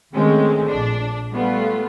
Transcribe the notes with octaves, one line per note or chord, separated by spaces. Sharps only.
D#3 G#3 A3 C4 C#4
A#1 D4
G3 A3 B3 F4